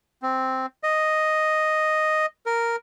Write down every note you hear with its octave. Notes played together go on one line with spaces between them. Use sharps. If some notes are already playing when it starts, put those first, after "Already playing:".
C4
D#5
A#4